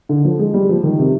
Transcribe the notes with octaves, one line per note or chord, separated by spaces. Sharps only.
D3
F3
G#3
G3
F3
D#3
C3